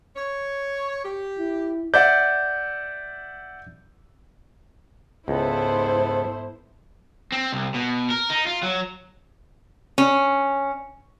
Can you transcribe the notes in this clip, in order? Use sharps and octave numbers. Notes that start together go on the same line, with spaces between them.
C#5
G4
E4
D5 E5 F#5 G6
C#2 G#2 B3 E4 A4 C5
C4
C2
B2
A#4
D#4
F4
F#3
C#4